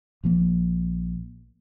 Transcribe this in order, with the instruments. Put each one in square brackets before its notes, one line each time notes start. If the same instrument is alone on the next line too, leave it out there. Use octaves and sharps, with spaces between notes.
[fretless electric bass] A#1 F3 A#3